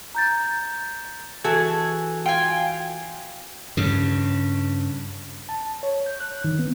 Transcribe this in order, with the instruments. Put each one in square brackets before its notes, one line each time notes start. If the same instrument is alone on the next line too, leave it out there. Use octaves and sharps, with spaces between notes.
[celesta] A#5 G6 A6
[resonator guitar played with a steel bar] E3 F#4 A4 [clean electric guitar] G#4
[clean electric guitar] F4 [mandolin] G5 G#5
[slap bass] G2 C#3
[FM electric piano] A5
C#5
G6
F#6
D#3
B3